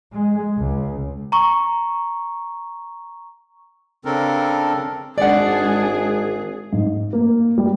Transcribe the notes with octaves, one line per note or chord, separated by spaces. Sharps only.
G#3
C#2
A#5 C#6
C#3 C4 D4 A4 A#4
G#1 G#3 D4 G#4 D5 F#5
G#2
A#3
G3